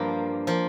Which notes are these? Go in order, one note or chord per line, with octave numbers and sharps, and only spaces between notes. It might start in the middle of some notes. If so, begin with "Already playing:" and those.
Already playing: G2 F3 A#3
F3 A#3